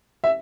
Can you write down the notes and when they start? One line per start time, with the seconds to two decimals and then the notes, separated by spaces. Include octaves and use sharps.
0.24 E5